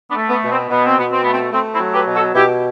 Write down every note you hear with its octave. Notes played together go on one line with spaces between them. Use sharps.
B3 D4
A3
B3
B2
C4
B2 B3
C4
B2 B3
C4
A3 B3
C4
A3 C4
C4 E4
F#3
G4 B4
B2
F#4 A4
B2 E4 G4